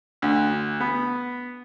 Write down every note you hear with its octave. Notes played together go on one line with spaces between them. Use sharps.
D2
B3